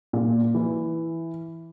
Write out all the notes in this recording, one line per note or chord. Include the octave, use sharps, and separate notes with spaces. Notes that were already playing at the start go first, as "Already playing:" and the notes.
A#2
E3